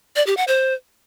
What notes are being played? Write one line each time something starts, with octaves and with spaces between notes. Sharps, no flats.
D5
G4
F#5
C5